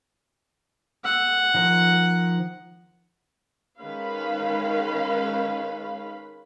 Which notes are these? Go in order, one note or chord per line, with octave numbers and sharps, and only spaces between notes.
F#5 E6
D#3 F3
D#3 G#3 C#4 B4 F5 B5